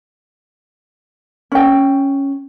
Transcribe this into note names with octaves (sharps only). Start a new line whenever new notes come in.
C#4 G5